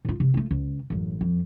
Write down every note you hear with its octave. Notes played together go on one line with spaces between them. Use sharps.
A2 F4
C3
A3 F4
C#2
A1 F#2
F2